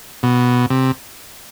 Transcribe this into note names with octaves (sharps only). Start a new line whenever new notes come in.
B2
C3